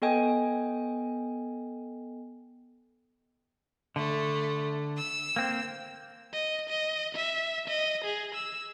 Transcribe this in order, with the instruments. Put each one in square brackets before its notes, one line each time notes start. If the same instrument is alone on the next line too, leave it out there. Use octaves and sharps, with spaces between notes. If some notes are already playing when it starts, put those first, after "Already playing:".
[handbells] B3 A4 D#5 G5 G#5
[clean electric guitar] D3 [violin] A3
[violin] E6
[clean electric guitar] A#3 C4
[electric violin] D#5
D#5
E5
D#5
G#4
E6